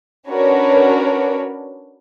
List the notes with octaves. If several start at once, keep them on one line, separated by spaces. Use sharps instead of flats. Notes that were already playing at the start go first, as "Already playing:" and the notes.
C#4 D4 F#4 A#4 B4 C#5